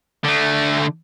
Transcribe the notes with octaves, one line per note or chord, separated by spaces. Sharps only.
D3 A3